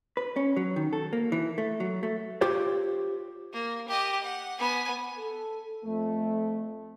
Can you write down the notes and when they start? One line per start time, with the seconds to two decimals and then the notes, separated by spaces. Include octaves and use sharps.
0.17 B4
0.36 C#4
0.57 F#3
0.76 D#3
0.93 A4
1.13 A#3
1.32 E3
1.58 A3
1.80 F#3
2.03 A3
2.41 F4 G4 C5 C#5
3.53 A#3
3.88 G4 D#5
4.23 F#5
4.59 B3 G#5
5.18 A4
5.85 F2 A3